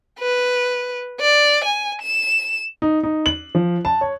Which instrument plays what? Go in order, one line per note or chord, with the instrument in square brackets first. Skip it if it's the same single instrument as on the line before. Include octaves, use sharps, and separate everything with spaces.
[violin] B4
D5
G#5
E7
[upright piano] D#4
D#4
F#7
F3
A5
C#5